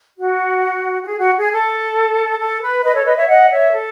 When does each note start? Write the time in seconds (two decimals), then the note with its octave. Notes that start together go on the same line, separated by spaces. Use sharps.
0.17 F#4
1.03 F#4
1.07 G#4
1.18 F#4
1.39 G#4
1.50 A4
2.39 A4
2.62 B4
2.83 B4 D#5
2.94 A4 C#5
3.05 B4 D#5
3.16 C#5 E5
3.28 D#5 F#5
3.50 C#5 E5
3.72 A4